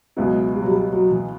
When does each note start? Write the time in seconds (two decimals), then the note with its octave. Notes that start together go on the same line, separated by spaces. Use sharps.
0.16 C#2 B2 F#3 G#3 B3 E4
0.55 G3
0.63 F#3
0.71 G3
0.93 F#3
1.11 E3